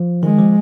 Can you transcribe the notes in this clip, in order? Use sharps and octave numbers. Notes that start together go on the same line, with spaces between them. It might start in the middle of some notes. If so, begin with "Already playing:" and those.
Already playing: F3
D#3 G#3
F3